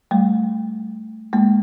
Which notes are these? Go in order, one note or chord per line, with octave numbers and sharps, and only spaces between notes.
G3 A3
G#3 A#3